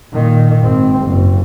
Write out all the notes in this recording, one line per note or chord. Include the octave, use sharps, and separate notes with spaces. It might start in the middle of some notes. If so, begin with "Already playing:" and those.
A#2 D#3
G#1 C4
F#1